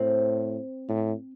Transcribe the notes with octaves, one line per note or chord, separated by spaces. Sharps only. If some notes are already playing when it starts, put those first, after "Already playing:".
Already playing: A2 C4
A2